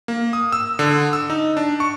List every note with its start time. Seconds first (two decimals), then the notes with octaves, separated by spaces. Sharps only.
0.08 A#3
0.33 D#6
0.52 E6
0.79 D3
1.13 E6
1.30 D#4
1.57 D4
1.80 C#6